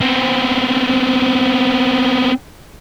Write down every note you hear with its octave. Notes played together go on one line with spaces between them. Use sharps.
B3 C4